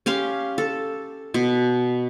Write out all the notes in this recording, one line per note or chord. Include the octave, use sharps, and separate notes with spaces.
C#4 G4 F5 C6
A4
B2